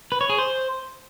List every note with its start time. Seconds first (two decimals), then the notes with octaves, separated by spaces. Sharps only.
0.12 B4
0.21 C#5
0.30 G#4
0.38 C5